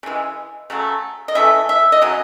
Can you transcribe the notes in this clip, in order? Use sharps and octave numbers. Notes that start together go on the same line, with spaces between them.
C#3 E3 G#3
C#3 F#3 A3
D#5
C#3 E3 A3 E5
E5
D#5
C#3 F#3